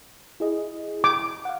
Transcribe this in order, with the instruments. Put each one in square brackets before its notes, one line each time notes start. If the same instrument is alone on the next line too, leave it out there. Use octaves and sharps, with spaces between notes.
[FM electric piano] E4 G#4 D#5
[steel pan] D6
[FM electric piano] F5 F#5